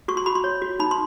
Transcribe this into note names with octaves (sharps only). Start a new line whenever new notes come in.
F#4 C#6
C6
F#4 B5
C6
C#5
F#4
D#4 B5
C6